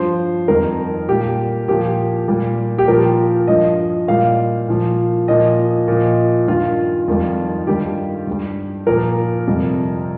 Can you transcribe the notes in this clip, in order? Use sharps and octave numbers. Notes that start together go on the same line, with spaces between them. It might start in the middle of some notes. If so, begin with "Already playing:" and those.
Already playing: G2 F3 C5
F2 D#3 G3 A#4
A#2 G3 G4
A#2 F3 G4
A#2 G3
G4
A#2 F3 A#4
G2 F3 D#5
A#2 G3 F5
A#2 F3
A#2 F3 D#5
A#2 F3
G2 D#3 G3 F4
F2 D#3 G3
G2 D#3 G3 G4
G2 G3
A#2 F3 A#4
F2 C3 G3